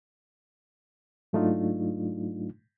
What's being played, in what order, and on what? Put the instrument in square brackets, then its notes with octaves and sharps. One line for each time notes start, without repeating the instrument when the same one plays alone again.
[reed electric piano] G#2 F#3 A3 D4 D#4 F4